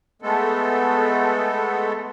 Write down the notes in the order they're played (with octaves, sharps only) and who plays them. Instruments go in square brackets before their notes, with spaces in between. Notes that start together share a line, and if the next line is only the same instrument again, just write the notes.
[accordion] G#3 A3 B3 A4